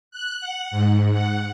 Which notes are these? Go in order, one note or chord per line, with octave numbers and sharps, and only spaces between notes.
F#6
F#5
G#2
F#5